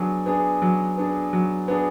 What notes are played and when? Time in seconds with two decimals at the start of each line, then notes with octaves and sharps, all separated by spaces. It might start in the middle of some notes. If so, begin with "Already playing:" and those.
Already playing: F#3 B3 D4 G#4
0.26 B3 D4 G#4
0.62 F#3
0.98 B3 D4 G#4
1.33 F#3
1.68 B3 D4 G#4